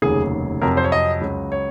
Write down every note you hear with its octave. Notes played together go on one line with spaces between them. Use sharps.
F1 D#2 C#3 F#3 G#4
F2 C3 F#3 A#4
C5
C#5
D#5
C#2 C#3 F#3
C#5